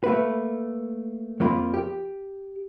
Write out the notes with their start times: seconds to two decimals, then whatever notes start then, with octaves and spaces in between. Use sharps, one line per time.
0.04 A3 A#3 B4
1.40 F2 A#3 F4 B5
1.74 G4